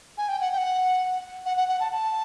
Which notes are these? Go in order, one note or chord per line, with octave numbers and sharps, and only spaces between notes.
G#5
G5
F#5
G5
F#5
F#5
F#5
F#5
A5
A5